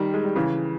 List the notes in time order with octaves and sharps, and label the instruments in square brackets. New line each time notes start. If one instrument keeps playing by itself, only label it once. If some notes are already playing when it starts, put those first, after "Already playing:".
Already playing: [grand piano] D#3 G3
G#3
G3
C#3 E3